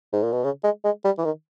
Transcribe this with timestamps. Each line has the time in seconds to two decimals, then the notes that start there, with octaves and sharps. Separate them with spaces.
0.13 G#2
0.23 A#2
0.32 B2
0.44 C#3
0.64 G#3
0.84 G#3
1.05 G3
1.18 E3
1.24 D#3